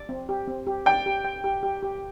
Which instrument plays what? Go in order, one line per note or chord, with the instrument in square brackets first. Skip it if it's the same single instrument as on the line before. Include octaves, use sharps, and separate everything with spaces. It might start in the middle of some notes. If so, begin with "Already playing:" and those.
Already playing: [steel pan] D5
C4
G4
C4
G4
[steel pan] D5 [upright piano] G5
[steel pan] G4
G5
G4
G4
G4